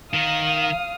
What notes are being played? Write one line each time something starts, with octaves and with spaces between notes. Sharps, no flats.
D#3 A#4 F5 D#6